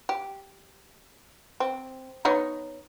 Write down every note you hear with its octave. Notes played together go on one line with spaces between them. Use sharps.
G4
C4
B3 D#4 C#5